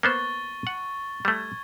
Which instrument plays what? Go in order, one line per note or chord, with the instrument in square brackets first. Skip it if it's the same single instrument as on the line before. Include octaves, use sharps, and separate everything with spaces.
[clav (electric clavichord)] A#3 B3 C5 [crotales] C#6 A6 G7
[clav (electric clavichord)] F#5
[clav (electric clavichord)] G3 A3 [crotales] G#6